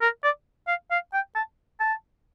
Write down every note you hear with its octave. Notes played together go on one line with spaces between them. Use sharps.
A#4
D5
F5
F5
G5
A5
A5